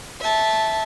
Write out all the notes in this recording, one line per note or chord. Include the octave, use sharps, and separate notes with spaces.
E5 A5